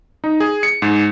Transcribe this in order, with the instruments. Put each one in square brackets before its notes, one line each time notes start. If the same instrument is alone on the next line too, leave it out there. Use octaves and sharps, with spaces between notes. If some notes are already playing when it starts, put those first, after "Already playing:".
[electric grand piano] D#4
G#4
C#7
G#2